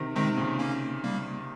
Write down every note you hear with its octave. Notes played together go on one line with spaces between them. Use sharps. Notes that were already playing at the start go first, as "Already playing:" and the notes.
Already playing: C3 D#3
C3 D#3 G#3 C4
A#2 C#3
A#3 C#4
G3 A#3